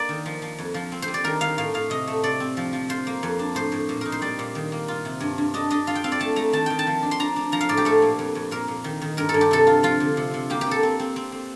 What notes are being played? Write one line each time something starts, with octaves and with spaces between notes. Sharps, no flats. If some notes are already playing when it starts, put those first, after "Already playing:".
Already playing: A#3 D5 A#5
D#3
F3
F3
F2
F3
C4
C5
G3
D5
D#3 A#4
D#3 F5
A2 F5
A2 F5
C3 D#5
A3
C3 D5
C4
F3
F3
F4 C5
A#3
F2
D4
A2 C5
A2
A#2
D#4 A#4
C5
G3 D5
A#2
D#3
A#3
F4
C3
G2
G2
D4 D#5
D4 D#5
F4 F5
G5
C4 F5
D5
A3 A5
A3 A#5
D#3 A5
D#3 G5
A5
F3
D4
C6
D4 A#5
D4
F3 A#5
F5
A2 D5
G4
A3 A4
A#2
F2
F2
A#2 A#4
A#2
D#3
D#3
G2 A#4
A4
G2
G4
C3 A4
F4
F3 F4
D3
C3
C3
A#3 G4
G4
A#3 A4
C4
C4
C4
C4